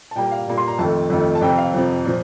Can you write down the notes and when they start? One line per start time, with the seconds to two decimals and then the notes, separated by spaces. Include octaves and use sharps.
0.11 A5
0.15 A#2 G3 A#3 G5
0.31 F5
0.47 A#2 G3 A#3
0.58 C6
0.68 A#5
0.79 F2 D#3 A3 A5
1.10 F2 D#3 A3
1.35 A5
1.41 F2 C3 F3 G5
1.58 F5
1.74 F2 C3 F3
2.05 A#2 F3